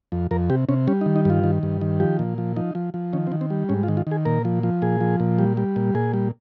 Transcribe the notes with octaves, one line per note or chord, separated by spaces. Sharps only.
F2
F2 A#4
C3 G4
C3 C#4
G3 C#4
D#4
D#3
D#4
G2 F4
D#3
G2
D#3
F3 G4
A#2
F3
F3 D#4
F3
F3
D#3 C#4
C4
D#3
C4
G3
G#2 C#4
F4
D#3
F4
D#3 G#4
A#2 A#4
F3
F3
A#2 G#4
F3
A#2
G3
G3
A#2
A#2 G#4
G3